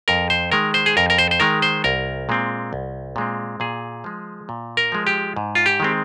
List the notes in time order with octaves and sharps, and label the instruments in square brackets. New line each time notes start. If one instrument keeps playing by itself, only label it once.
[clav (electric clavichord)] F2 A#4
C5
D#3 G#3 A#4
C5
G#4
F2 A#4
A#4
C5
C5
D#3 G#3 A#4
C5
C2 A#4
A#2 G#3 C4
C2
A#2 G#3 C4
A#2 G#4
F3 G#3
A#2
A#4
F3 G#3
G4
G#2
F4
G4
D#3 G#3 C4